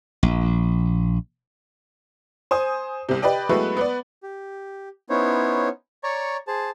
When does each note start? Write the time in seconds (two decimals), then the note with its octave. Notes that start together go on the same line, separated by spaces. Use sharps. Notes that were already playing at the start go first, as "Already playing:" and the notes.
0.23 A#1
2.51 C5 G#5 D#6
3.09 C2 C3
3.22 G4 B4 D5 D#5 G5
3.49 F#3 G#3 A3 B3 E4 B4
3.77 B3 B4 D5
4.23 G4
5.10 B3 C#4 D#4 E4 C5 C#5
6.04 C#5 D5 A#5 C#6
6.47 G#4 C5 A5